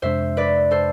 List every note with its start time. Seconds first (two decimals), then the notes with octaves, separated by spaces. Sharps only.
0.02 F2 C3 G#3 D4 C5 E5
0.37 B4 D5
0.71 A4 C5